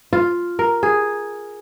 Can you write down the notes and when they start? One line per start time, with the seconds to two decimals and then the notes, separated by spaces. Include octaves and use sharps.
0.13 F4
0.59 A#4
0.83 G#4